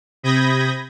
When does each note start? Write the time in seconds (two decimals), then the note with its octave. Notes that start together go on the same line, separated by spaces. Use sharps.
0.23 C3 B5 D#6 G6 G#6 A#6